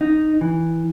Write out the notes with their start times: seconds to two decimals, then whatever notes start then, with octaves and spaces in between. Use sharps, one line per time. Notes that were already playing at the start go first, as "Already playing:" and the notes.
0.01 D#4
0.41 E3